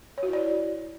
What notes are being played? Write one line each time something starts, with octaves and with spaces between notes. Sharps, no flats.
C#5
F#4
E4
D5